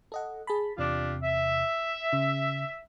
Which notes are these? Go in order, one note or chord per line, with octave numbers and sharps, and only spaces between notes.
A4 D#5 F#5
G#4 A5 B5
E2 C3 D4 F4 G4
E5
C#3